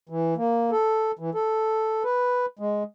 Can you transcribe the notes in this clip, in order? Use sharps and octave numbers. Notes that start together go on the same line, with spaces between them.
E3
A#3
A4
E3
A4
B4
G#3